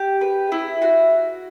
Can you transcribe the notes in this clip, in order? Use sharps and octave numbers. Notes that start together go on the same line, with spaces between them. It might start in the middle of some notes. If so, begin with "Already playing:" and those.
Already playing: G4
B4
E4
F#4